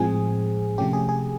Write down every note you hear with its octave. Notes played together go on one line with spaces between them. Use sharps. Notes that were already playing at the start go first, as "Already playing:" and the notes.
Already playing: A2 F3 G#3 C4 G#4
C3 F3 A3 C#4 G4
G#4
G#4